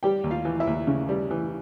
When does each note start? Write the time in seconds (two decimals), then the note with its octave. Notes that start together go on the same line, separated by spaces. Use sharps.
0.03 G3 G4 G5
0.24 D#2
0.31 F4 F5
0.45 E3
0.60 E4 E5
0.67 D#2
0.87 C#3
1.09 G3
1.30 E3